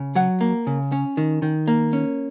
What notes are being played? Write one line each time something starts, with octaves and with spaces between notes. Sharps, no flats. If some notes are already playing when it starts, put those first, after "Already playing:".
Already playing: C#3
F#3 F#5
A#3
C#3
C#4
D#3
D#3
A#3
C#4